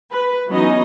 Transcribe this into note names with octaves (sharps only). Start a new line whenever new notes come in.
B4
E3 F#3 B3 C#4 D#4 D#5